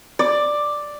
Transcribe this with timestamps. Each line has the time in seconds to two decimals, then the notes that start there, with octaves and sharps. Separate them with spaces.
0.19 D5